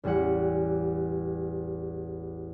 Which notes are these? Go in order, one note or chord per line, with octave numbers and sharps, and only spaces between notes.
A1 E2 G3 E4 F#5